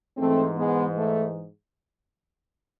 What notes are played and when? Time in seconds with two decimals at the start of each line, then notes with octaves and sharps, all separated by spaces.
0.17 G#2 E3 A3 C4
0.57 G#3 B3
0.96 A3